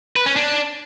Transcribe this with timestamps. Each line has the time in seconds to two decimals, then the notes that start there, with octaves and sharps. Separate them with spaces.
0.16 B4
0.26 C#4
0.36 D4